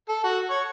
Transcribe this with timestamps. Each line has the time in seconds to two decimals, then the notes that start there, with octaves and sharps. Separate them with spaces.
0.09 A4
0.24 F#4
0.50 C#5